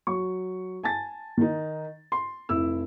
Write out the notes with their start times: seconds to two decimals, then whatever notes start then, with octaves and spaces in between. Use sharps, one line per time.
0.07 F#3 C#6
0.83 G#5 A5 A6
1.37 D#3 D#4
2.12 C6
2.49 F1 E4 E6